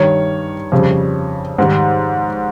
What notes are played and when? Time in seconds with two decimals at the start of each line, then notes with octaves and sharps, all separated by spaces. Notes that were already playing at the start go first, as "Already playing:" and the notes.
Already playing: G2 D#3 G3 C#5
0.72 F2 C#3 G3
1.58 G#2 D#3 G3